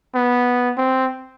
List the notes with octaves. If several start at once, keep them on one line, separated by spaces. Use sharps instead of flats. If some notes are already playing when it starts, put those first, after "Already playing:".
B3
C4